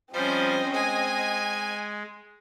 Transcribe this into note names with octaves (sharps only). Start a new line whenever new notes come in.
F3 G3 C4 C#4 C5 D#5
G#3 G#5